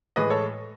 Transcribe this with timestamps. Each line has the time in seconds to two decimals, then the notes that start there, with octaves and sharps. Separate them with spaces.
0.16 A2 E3 G#3 B4 D#5
0.30 A4 C#5